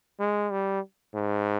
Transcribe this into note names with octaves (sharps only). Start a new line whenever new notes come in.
G#3
G3
G#2